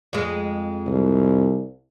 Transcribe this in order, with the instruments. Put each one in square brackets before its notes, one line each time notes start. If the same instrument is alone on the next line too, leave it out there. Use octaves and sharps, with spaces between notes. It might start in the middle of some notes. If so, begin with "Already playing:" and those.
[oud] F2 G#3
[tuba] C2